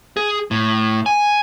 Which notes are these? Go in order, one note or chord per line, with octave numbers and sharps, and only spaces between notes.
G#4
A2
G#5